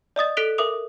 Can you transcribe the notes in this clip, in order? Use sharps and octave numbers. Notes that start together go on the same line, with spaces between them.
D5 D#5 D#6 A6
A4 F#6 B6 D7 F7 G7
A#4 E5 D6 D#6 F7